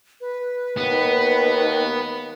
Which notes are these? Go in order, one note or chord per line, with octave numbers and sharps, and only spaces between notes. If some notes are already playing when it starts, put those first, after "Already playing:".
B4
D#2 B3